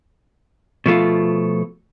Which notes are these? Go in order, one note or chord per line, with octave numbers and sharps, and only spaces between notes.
B2 F3 A3 F4